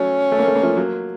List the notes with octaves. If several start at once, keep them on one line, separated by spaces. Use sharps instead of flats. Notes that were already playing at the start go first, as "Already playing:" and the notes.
Already playing: F#3 A3 C#4
A3
A#3
A3
A#3
F3 A3
F#3 A#3